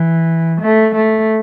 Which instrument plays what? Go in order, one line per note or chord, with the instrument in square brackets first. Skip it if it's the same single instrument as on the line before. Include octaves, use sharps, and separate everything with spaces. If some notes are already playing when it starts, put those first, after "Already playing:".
Already playing: [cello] E3
A3
A3